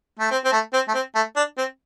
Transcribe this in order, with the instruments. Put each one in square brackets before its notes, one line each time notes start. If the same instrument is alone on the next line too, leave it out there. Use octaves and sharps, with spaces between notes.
[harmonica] A3
C4
C4
A3
C4
A3
C4
A3
D4
C4